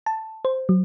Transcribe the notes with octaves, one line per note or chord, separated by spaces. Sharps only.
A5
C5
F#3